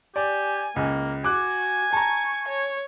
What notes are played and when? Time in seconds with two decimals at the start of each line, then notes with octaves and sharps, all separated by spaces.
0.16 G4 D5 G#5
0.76 C#2 A#3
1.24 F#4 G#5 D6 F#6
1.93 A5 A#5 C#6
2.48 C#5